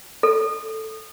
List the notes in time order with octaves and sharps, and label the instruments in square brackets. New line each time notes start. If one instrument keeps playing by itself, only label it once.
[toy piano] A4